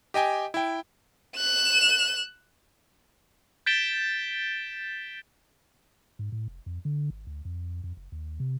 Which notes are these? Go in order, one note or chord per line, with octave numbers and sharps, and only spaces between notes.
G4 D#5 G5 G#5
E4 G5
F#6 E7
G6 A6 B6 D7 E7 G7
G#2
A2
F1
F2
D3
G#1
D2
F2
F2
F#1
D#2
C3